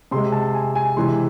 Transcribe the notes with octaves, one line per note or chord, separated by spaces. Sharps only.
C3 G#3 C6
A5
G#5
G#5
C3 E3 G#3 C6